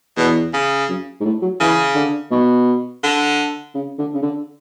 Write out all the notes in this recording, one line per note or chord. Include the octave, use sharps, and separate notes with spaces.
E2 B2
C#3
F#2
G#2
A2
F#3
C#3 E3
D3
B2
D3
C#3
D3
C#3
D3